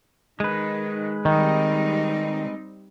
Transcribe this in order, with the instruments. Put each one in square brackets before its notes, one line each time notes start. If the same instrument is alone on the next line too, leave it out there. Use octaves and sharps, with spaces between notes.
[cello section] D#3 [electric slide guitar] G#3 B4
[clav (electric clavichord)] D#3 [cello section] G3 C4 D#4